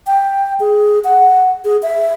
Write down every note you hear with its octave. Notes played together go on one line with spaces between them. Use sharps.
G5
G#4
F#5
G#4
E5